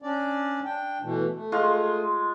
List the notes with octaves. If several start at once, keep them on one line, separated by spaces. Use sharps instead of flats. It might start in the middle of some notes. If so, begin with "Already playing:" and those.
C#4 D4 D5
D4 G5
B2 E3 A3
A3
G#3 F4 C#6